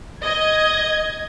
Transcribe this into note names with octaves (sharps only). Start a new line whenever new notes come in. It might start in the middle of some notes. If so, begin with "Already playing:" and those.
D#5 G#6